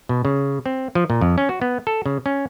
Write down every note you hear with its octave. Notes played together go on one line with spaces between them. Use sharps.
B2
C#3
C4
F3
A#2
F2
C#4
F#4
B3
A4
C#3
C#4